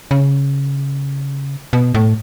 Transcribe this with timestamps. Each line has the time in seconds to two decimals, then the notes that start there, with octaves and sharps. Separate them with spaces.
0.11 C#3
1.73 B2
1.94 A2